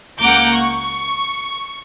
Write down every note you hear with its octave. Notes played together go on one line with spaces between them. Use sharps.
C#2 A#3 F#5 A#5 D6 G6
C#6